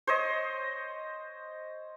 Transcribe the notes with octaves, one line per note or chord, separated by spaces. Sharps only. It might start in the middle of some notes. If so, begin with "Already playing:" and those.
C5 C#5 D#5